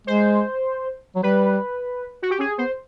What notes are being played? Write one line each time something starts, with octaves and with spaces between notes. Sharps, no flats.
G#3 C5
F#3
G3 B4
F#4
G4
C#4 G#4
B3 C5